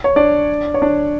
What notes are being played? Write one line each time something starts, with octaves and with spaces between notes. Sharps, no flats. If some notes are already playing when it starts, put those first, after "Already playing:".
C#5
D4 D5
C#5
D4 D5